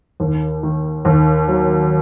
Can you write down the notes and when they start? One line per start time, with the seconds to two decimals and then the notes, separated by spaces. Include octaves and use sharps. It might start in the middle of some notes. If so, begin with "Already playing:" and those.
0.20 D#2
0.63 D#3
1.05 D#2
1.48 F#3